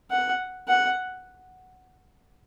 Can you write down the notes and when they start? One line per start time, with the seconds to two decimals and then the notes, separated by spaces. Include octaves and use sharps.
0.11 F#5
0.68 F#5